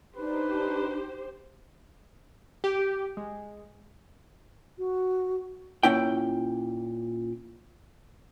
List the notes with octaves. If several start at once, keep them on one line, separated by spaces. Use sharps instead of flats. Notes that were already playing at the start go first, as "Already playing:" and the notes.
D4 D#4 G4 B4 C5
G4
G#3
F#4
A#2 C#4 E4 G5